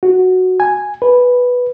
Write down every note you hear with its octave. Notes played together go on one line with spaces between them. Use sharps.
F#4
G#5
B4